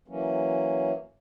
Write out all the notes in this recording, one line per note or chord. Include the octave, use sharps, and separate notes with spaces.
E3 F#3 A#3 C#4